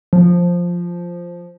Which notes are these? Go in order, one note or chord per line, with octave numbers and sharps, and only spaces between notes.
F3